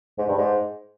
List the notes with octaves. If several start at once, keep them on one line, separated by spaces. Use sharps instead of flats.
G#2
G2
G#2